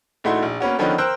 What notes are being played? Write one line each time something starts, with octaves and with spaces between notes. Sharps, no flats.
A#1 A3 D#4 E4 F#4 C6
A#1
A#3 B3 C#4 F#4
D3 D#3 F3 B3 C#4 D#4
A#4 C5 G5 E6 F#6